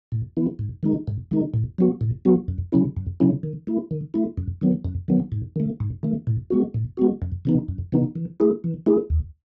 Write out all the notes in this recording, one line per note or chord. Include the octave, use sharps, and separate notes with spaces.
A2
E3 B3 E4
G#2
D#3 G#3 D#4
G#2
D#3 G#3 D#4
A2
F#3 B3 F#4
A2
F#3 B3 F#4
F#2
C#3 F#3 C#4 E4
F#2
C#3 F#3 C#4 E4
D#3
A3 E4
D#3
A3 E4
F#2
D#3 F#3 B3
F#2
D#3 F#3 B3
G#2
D#3 A3
G#2
D#3 A3
A2
G#3 B3 F#4
A2
G#3 B3 F#4
F#2
C#3 E3 B3 D#4
F#2
C#3 E3 B3 D#4
E3
A3 E4 G#4
E3
A3 E4 G#4
D#2